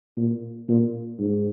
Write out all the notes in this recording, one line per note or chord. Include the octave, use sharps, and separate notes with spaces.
A#2
A#2
G#2